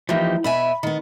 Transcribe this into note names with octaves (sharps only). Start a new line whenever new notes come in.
E3 F3 A#3 D#4 G4
B2 E5 G#5 B5
D#3 B3